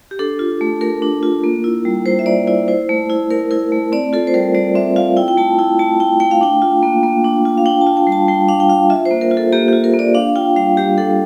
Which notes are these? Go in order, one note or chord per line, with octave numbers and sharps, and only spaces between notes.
G4
D4 A4
F4
A3
A3 A#4
D4
F4
A#3
E4
G3
G3 C5
E5
A#3 D5
E4 D5
E4 C5
A3
E4
A3 A#4
E4 A#4
A3
C4 D5
F4 A4
C5
G3 A#4
G3 D5
C4 E5
F4 F5
E4 G5
G5
A3 A5
E4 G5
A3 A5
E4 G5
A3 G5
F5
D4 G5
F4
A#3
A#3
D4
F4
F5
D4 G5
A5
F4
G5
G3
A5
G3 G5
D4 F5
G5
F4 F5
F4 E5
C5
A#3
A#4
F4
A4
A#3 G4
F4 G4
A#4
A#3
D5
D4 F5
F4 G5
G3 F5
G3 G4
D4 A4